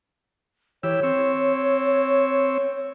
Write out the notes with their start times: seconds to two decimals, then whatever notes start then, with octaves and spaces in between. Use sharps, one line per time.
0.83 E3 G4 C#5 E6
1.03 C4 C#6 E6